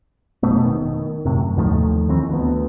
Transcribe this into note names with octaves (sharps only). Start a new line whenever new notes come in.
F1 B2 A3 B3
D#3
F#2 A2 C3
D#2 D#3 F3 A3
D#3 E3 C4
D2 B3